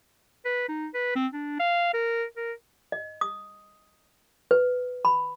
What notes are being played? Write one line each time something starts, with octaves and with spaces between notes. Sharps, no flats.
B4
D#4
B4
C4
D4
F5
A#4
A#4
D#5
D#6
B4
B5